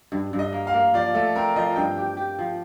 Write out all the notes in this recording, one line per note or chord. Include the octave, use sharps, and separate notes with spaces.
G2
G2
D#5
A#3
F5
A#3
F3 D5
A3 A4
C4 A#4
F3 D#5
G2 G5
G4
G4
F3